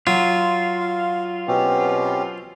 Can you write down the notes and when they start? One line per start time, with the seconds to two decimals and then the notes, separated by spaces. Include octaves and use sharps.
0.07 F#3 F4
0.80 F5
1.48 B2 C4 C#4 G4